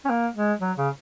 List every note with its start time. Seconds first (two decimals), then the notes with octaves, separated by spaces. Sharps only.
0.05 C#4
0.10 A#3
0.36 G#3
0.60 F#3
0.77 C#3